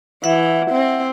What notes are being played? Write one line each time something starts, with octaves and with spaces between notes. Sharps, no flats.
E3 E5 F#5
C4